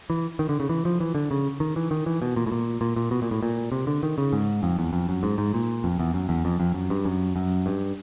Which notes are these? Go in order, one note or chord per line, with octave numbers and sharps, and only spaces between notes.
E3
D#3
D3
C#3
E3
F3
E3
D3
C#3
D#3
E3
D#3
E3
B2
A#2
A2
A#2
A#2
A#2
B2
A#2
A2
A#2
C3
D3
D#3
C#3
G#2
F2
E2
F2
F#2
G#2
G#2
A#2
F2
E2
F#2
E2
F2
F2
F#2
G2
F#2
F#2
G2